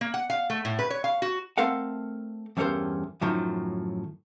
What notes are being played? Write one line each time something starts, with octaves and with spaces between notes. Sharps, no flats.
A#3
F#5
F5
A3
A2
B4
C#5
F5
F#4
A3 C4 A4 A#4 F5 F#5
E2 G2 C#4 A4 A#4 C5
F#2 A2 D#3 F3 F#3